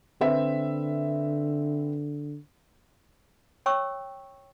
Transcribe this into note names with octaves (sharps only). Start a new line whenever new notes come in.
D3 C4 B4 E5
C#5 G5 C#6 E6